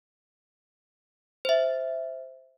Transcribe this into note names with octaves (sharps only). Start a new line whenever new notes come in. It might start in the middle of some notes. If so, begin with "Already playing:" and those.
C5 E5